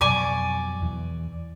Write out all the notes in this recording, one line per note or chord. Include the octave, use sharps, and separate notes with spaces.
F2 B2 F#3 D5 G#5 C#6
E2 E3